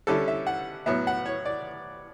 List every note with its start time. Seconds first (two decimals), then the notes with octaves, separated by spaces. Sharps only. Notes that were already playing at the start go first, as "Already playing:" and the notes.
0.07 D3 G3 C#4 E4 A4
0.28 E5
0.47 F#5
0.86 A2 F#3 B3 E5
1.07 F#5
1.26 C#5
1.45 D5